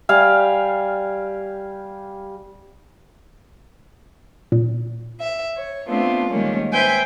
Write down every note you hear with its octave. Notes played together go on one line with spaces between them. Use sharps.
G3 F5 G#5
A#2
E5
C#5
A3 B3 C4 D4 F4
D#3 G3 G#3 A#3 C#4
B4 C5 E5 G5 G#5 G6